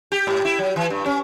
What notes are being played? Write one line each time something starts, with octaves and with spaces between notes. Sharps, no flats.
G4
G#2
E4
F#3
E3
G2
C#4